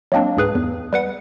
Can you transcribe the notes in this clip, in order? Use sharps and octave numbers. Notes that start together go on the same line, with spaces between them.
F#3 G#3 A#3 C4 D4
C#2 G#2 G#4 B4
E2
G3 B4 F#5